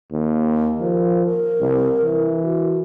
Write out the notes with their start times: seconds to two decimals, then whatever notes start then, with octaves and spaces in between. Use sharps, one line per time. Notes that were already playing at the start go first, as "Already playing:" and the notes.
0.12 D#2
0.81 F3 A#4
1.26 A#4
1.60 C2
2.04 E3
2.43 F#4